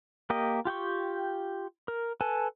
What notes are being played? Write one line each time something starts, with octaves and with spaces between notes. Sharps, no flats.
A#3 G4 A#4 D#5
F4 G4 G5 C#6
A#4
A4 B4 G#5 A5